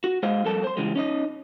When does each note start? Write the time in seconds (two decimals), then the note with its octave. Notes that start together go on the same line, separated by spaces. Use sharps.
0.04 F#4
0.23 G#3 G#4 C5 D#5 F5
0.45 F2 G3 A4 A#4 A5
0.64 C5 C6
0.77 C#3 E3 G3 G#3
0.96 C#4 D#4 D#5